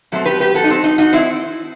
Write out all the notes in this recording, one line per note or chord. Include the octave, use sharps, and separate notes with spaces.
B2 F#3 A3 C4
G4 B4
G4 B4
F#4 A4
D#4
C4
D#4
D#4 F#4
C4 E4